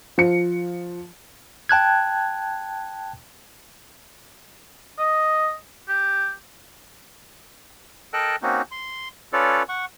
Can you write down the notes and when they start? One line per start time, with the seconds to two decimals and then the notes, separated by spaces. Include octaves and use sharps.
0.18 F3 C#7
1.69 G5 A5 F#6 G#6
4.98 D#5
5.88 G4
8.13 A4 A#4 D#5 G5 A5 F#6
8.42 A#3 C4 C#4 D#4 F#4
8.71 C6
9.33 C#4 F4 A4 B4 C#5 D5
9.69 F#5 C#6